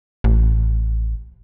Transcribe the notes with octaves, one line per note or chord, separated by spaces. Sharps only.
A1